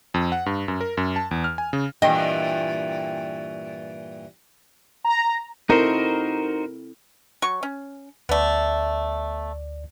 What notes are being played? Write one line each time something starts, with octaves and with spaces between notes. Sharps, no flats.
F2
F#5
G2
F#2
A#4
F#2
A5
E2
F6
G#5
C#3
G2 A#2 E3 D#5 G5
A#5
C4 D#4 E4 F#4 A4 A#4 C5
F#3 C#6
C#4
D2 A3 B3 D5